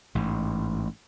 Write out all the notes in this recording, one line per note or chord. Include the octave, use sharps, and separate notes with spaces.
A1 G#2